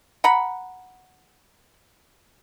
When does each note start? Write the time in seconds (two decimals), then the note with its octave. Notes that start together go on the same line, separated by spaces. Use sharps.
0.24 F#5 A#5 B5